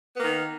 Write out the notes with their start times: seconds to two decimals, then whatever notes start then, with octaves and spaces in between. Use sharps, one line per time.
0.16 B3
0.19 A#3
0.23 D#3